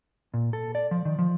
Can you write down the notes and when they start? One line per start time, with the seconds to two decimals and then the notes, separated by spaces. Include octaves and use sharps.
0.34 A#2
0.53 A4
0.75 D5
0.91 F3
1.05 D#3
1.19 F3